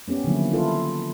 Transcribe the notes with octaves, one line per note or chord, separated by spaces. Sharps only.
B3 C#4 G4
D3 D#3 F3 F#3 A#3 E4
E4 F4 A4 B4